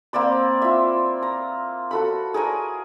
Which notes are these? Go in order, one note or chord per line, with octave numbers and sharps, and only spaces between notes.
A#3 C4 D5 B5
F4 E5
A#5
F#4 A4 B5
G#4 A#4 C#5 G#5